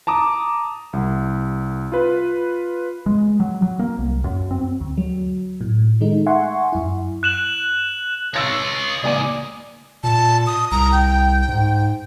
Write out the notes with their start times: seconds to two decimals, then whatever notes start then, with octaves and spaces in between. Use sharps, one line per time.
0.07 A5 A#5 D6 D#6
0.93 C2
1.92 F4 B4
3.06 G#3
3.40 F#3
3.62 F#3
3.79 A#3
3.98 C2
4.24 F#2
4.51 C4
4.80 D2
4.98 F#3
5.61 A2
6.01 D#3 G#3 A3 D#4
6.26 E5 F#5 G#5 C6 C#6
6.73 F#2 E4
7.23 F#6 E7 F#7
8.34 G#4 C#5 D#5 E6 A6 A#6
9.04 C#2 A#3 D5 G#5 D6 D#6
10.03 A#2 A5
10.47 D#6
10.71 C2 A#5
10.92 G5
11.48 G#2